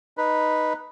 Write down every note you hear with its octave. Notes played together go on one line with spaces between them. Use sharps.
D#4 B4